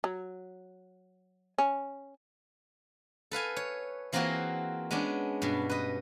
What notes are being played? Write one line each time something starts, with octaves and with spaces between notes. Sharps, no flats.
F#3
C#4
A4 B4 F5 G#5
C#5
E3 A#3 C4 F4 F#4 G#4
G#3 B3 C#4 D4
G2 B2
B4 D#5